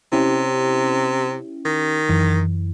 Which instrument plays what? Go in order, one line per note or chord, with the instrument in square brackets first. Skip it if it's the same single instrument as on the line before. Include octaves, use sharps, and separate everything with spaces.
[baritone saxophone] C3 [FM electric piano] C#4 E4 G4
[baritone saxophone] D#3
[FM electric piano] F#2 E3